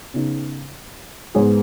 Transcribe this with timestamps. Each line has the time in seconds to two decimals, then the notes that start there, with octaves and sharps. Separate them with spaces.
0.14 C#3 B3 D#4
1.35 G#2 G#3 B3 G#4 B4